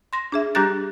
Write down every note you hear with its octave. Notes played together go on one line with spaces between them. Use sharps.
C6 A#6
D4 G#4 E5
G3 D4 G4 A#5 F#6 A6